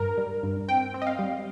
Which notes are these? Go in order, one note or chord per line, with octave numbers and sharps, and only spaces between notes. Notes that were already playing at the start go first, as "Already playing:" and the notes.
Already playing: G2 A#4
G3
G2
C4 G5
C4
D#5
F5
G3